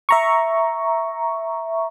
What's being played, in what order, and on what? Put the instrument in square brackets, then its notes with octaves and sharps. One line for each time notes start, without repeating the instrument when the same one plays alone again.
[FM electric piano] E5 A#5 C#6